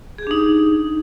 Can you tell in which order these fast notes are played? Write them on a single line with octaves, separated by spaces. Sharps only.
G#4 G4 D4 D#4